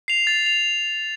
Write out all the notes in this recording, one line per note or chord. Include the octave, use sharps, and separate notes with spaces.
C7 F7
A6
F7